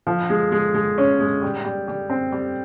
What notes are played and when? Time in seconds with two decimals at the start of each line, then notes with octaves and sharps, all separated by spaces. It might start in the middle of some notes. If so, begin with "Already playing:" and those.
0.07 F3
0.30 G#3
0.52 G#3
0.74 G#3
0.98 C#4
1.20 G#3
1.42 G3
1.65 G3
1.88 G3
2.10 C4
2.32 G3